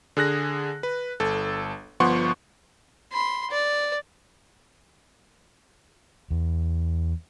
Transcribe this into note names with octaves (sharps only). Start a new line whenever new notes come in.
D3 G#4 F#6 A#6
B4
G1 A4
G1 F3 B3 F#5 C6 C#6
B5 C6
D5
E2